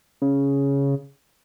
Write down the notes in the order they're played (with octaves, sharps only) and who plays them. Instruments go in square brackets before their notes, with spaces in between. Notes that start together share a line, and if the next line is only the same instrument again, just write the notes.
[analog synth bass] C#3